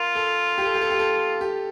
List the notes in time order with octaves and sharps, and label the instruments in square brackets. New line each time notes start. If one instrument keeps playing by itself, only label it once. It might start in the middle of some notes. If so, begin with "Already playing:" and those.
Already playing: [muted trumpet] F4 [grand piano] A#4
[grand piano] A4
G4
A4
G4
A4
G4
A4
G4